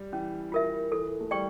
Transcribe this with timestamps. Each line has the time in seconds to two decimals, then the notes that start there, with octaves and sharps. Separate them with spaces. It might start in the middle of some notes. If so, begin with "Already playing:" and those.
Already playing: G3
0.12 E3 C#4
0.52 F4 A#4 E5
0.92 E3 A4
1.20 A3
1.31 G3 D5 G5 C#6